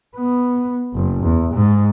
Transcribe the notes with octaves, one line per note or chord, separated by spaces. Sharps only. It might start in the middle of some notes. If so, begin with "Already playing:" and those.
B3
F#1
E2
G#2